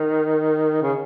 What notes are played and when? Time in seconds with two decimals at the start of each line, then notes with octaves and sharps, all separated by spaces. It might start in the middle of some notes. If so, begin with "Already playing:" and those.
Already playing: D#3
0.82 C#3